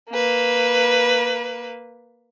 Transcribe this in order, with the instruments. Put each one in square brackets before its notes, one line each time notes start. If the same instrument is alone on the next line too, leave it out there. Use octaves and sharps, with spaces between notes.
[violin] A#3 B4